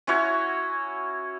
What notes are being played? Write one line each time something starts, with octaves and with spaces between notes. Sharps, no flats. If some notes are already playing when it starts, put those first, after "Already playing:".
C#4 E4 F#4 C#5